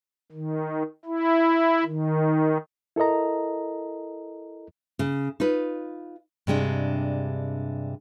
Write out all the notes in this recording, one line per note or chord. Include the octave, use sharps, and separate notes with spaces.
D#3
E4
D#3
E4 A4 A#4 D#5 A#5
C#3
D#4 F4 B4
G2 C3 G#3 D4